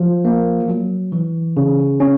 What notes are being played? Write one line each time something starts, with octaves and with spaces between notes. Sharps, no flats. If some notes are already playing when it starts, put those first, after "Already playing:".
Already playing: F3
A#3
F#3
E3
C#3
C#4